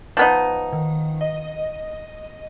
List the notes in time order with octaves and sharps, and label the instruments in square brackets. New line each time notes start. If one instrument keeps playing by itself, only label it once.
[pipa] F3 B3 D#4
[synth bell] D#3
D#5